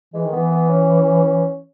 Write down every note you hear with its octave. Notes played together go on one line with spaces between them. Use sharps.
E3 G#3
D#3
E3 B3
B3
C#4